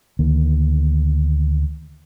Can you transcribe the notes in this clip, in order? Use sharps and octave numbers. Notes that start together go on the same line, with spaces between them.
D2 D#3 A#3